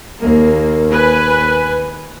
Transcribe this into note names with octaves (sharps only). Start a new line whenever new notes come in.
D#2 A#3
B4 G#5